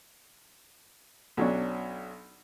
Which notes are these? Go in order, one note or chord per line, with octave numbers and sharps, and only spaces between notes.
B1 F#3 C#4 D4